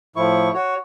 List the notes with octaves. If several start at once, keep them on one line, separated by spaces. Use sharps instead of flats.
A2 F3 E4 C#6
F#4 C#5